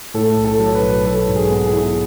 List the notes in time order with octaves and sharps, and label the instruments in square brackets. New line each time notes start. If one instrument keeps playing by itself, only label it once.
[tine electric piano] A2 [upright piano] A4
[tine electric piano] B1
[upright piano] A4
[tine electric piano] F#3
[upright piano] B4
[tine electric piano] B1
[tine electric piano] F#3 [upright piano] A4
[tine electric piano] G#2
[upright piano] G#4
[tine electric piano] B3
[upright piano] G#4
[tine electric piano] E4